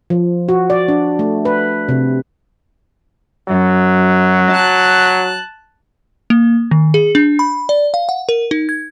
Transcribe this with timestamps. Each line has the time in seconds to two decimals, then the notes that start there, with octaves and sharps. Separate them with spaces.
0.10 F3
0.49 F#4
0.70 D5
0.88 D4
1.19 A3
1.45 B4
1.89 C3
3.49 F#2 F#3
4.51 A5 F#6
6.30 A#3
6.71 D#3
6.94 G#4
7.15 D4
7.39 B5
7.69 D5
7.94 F5
8.09 F#5
8.29 A#4
8.51 D#4
8.69 G#6